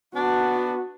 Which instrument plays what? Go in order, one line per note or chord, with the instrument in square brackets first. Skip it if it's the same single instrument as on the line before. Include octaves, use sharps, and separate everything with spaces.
[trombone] B3 [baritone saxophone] D4 [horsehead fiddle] F#4